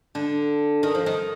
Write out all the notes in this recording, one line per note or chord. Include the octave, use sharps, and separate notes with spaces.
D3
D#3
F3
D#3